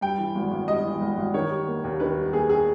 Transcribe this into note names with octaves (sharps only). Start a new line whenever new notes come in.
G2 G5
E3
G#1
G#1
G2 D#5
E3
G#1
G#1
D#3 C#5
G3
A#3
D#2
D#3 B4
G3
A#3 G#4
G#4